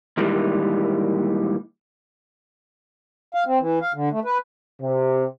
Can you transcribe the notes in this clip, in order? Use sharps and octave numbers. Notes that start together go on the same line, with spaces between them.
A#2 D#3 E3 G3 G#3
F5
C4
E3
F5
D3
A3
B4
C3